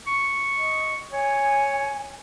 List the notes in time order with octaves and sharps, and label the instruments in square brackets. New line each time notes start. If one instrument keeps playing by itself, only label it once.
[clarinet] C#6
[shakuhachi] D#5
[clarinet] C#5 [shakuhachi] G#5